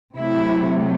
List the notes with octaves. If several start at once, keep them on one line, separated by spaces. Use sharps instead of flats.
C3 F#3 A3 E4